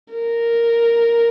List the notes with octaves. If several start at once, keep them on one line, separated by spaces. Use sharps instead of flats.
A#4